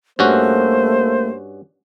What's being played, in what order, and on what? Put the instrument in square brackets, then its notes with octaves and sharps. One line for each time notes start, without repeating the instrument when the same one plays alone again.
[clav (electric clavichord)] G2 C#4 F#4 [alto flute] A3 [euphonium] A#3 [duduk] C5